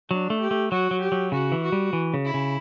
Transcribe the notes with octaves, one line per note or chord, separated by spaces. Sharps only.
F#3 D4
A3
G4
A3
F#3 F#4
F#3
G4
F#3
C#3 F#4
E3
F#4
G3
E3
C#3
E4
C#3